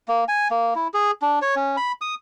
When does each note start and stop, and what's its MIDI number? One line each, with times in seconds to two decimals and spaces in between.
0.08 0.24 58
0.28 0.48 80
0.51 0.74 58
0.75 0.88 64
0.94 1.11 68
1.22 1.39 62
1.42 1.55 73
1.56 1.76 61
1.77 1.92 83
2.01 2.15 87